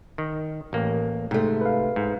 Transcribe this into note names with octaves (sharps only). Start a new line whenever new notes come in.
D#3
A1 A#3
G#2 C3 A3
B4 F5
G#2